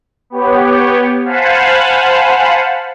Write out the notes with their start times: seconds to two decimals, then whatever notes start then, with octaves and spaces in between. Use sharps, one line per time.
0.30 B3 G4 C#5
1.25 C5 F5 F#5 G#5 A5 B5